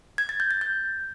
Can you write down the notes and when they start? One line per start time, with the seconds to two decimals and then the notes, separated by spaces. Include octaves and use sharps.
0.18 G#6
0.29 A6
0.40 G6
0.51 A6
0.61 G6